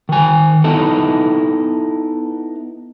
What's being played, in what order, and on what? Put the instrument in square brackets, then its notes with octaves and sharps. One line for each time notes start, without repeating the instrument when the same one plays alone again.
[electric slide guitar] D#3 G#5
B3 D#4 E4 A4